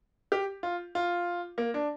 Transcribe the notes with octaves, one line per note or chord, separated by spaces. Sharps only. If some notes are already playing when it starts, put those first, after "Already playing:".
G4
F4
F4
A#3
D4